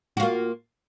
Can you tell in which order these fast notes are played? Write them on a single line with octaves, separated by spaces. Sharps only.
F#4 F4 A#3